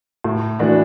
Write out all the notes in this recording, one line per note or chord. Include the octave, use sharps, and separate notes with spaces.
A2
E3 A3 D4 F#4